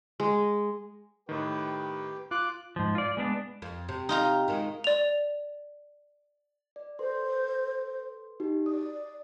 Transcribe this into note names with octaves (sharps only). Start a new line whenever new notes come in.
G#3
A2 D#3 G4 B4 G5
F4 D6 F#6
G#2 F3
F4 D5
G#3 B3 D4
F2
C3
D#4 F4 A#5
D#3 G#3
D5 F7
D5
A4 B4 C5 C6
D#4 F#4 G4
D5 D#6